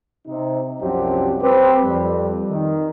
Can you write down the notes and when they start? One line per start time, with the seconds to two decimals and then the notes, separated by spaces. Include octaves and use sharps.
0.27 C3 D#4
0.80 C2 F#2 F3 F#3 C4 G4
1.41 C4 G4 B4
1.83 F2 G3
2.49 D#3